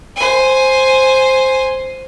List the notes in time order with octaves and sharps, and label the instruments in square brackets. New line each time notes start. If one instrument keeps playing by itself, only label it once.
[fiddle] C5 G#5